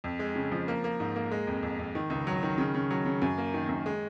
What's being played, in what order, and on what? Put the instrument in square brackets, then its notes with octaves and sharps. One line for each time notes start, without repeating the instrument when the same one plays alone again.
[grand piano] F2
G#3
C#3
F3
A#3
A#3
G#2
A#3
G#3
F2
F2
F2
D#3
C#2
F#3
D#3
C#3
C#3
F#3
C#3
F#2
A#3
D#3
F#2
G#3